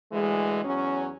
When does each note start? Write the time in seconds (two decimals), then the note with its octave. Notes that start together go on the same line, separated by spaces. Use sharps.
0.12 D2 E3 G#3
0.65 E2 F#3 C#4